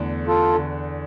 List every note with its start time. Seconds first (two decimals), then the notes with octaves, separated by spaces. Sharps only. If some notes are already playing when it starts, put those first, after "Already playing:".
Already playing: E2 D3 A3
0.27 F4 A4
0.54 D3